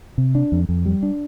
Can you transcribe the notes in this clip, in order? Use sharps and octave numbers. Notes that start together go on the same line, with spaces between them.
C3
D4
F2
F2
G3
D4